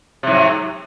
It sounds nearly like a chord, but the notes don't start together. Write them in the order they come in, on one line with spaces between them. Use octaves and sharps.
C3 G#2 F#3